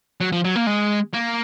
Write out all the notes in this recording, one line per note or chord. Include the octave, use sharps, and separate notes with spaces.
F#3
F3
F#3
A#3
G#3
A#3